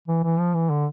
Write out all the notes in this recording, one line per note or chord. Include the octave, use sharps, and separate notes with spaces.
E3
E3
F3
E3
D3